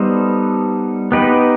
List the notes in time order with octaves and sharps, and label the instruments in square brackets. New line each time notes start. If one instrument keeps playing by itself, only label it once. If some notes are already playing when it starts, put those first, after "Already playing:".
Already playing: [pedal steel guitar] G3 B3 D#4 A4 C5
B3 D#4 G4 B4